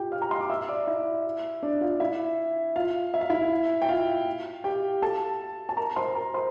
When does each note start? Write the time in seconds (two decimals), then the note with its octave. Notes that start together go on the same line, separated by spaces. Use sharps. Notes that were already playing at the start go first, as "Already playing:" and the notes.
Already playing: F4 G4 G5
0.12 F5 F6
0.22 A#5
0.31 C6
0.41 D6
0.50 E5 E6
0.69 D5 D6
0.87 E4 E5
1.63 D4 D5
1.81 F4 F5
2.00 E4 E5
2.76 F4 F5
3.14 E5
3.21 F5
3.30 E4 E5
3.82 G5
3.88 F4 F5
4.64 G4 G5
5.02 A4 A5
5.69 A5
5.77 A#4 A#5
5.96 C5 C6
6.15 A#4 A#5
6.34 C5 C6